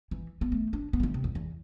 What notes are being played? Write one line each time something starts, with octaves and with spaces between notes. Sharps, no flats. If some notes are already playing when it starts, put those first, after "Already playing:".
E3
B3
A3
D4
B3
E3
D3
C3
E2
E2